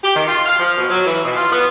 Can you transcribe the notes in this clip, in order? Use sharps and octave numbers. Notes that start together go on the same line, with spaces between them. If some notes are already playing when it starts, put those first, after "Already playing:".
G4
D#3
F4
F5
F3
B2
F#3
E3
B2
F4
B3